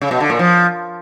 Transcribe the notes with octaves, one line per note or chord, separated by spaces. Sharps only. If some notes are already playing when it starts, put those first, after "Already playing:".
C#3
B2
D3
A#2
F3